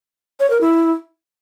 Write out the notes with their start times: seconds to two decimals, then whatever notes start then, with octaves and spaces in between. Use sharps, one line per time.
0.40 C#5
0.50 A#4
0.61 E4